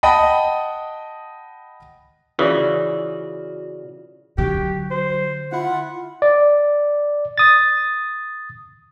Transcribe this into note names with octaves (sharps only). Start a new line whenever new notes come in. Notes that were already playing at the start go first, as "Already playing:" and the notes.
D#5 F#5 G5 A5 B5 D#6
C#3 E3 F4 F#4 D5
D3 F#3 G4
C5
E4 F4 F#5
D5
D#6 A6